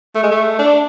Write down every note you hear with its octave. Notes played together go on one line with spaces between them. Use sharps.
A3
G#3
A3
D4